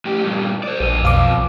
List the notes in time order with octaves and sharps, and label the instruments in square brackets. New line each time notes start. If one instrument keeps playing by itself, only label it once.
[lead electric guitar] A2 G4
G2 A#2
C5 D5
[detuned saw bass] A#1 [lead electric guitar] F#3 B4
[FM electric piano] B1 F5 D6 [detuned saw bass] F2